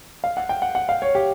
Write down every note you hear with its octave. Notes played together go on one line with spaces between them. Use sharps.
F5
F#5
G5
F#5
F#5
F5
C#5
G4